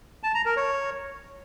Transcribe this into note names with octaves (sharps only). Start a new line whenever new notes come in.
A5
A#5
A#4
C#5